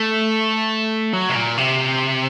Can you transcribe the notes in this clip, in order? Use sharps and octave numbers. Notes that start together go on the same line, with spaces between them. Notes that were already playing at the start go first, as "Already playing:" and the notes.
Already playing: A3
F#3
C3
A#2
C3